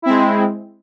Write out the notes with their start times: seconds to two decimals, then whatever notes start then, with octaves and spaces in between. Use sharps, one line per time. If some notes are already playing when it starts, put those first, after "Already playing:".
0.02 E4
0.06 C4
0.09 G#3